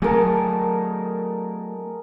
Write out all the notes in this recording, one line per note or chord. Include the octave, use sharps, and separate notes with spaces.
F#3 A3 G#4 A#4 A5